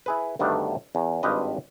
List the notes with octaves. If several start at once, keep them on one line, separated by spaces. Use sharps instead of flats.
E4 G#4 B4
D2 G2 D#3 A3 B3 D4
E2
G#1 G2 F4 G4 B4 D#5